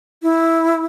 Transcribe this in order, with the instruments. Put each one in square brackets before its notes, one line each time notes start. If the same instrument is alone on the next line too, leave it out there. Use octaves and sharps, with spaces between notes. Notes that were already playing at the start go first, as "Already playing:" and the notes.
[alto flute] E4